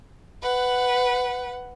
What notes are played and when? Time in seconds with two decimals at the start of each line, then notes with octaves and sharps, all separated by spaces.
0.42 B4 F#5